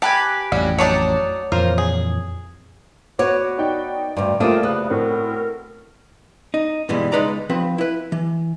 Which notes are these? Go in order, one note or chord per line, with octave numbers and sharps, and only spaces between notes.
G4 B4 G#5 A5
A1 F2 G3 C#4 F#4
F#3 D4 D#4 C#5 D5 A5
F2 A#2 E3 F4 A#4 C5
G#4
B3 F#4 B4 C#5 D6
D#4 D5 G5
D2 G2
F#2 G3 A3 A#3 C4 D4 F4 D#6
C2 C#3 B3 D#6 F#6
A2 C4 F#4 A4 A#4
D#4
G2 B2 E3 G3 G#3
C#2 G#3 D#4 B4 D5 A#5
F3 C4 B4
E4 B4
E3